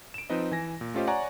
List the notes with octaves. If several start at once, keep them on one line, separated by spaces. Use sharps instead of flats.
D7 E7
F3 C4 D#4 B4 D#5
E3 G#5 A#6
A#2
A3 C#4 F4 G4 C5 D#5
C#5 D5 F#5 G#5 A#5 C#6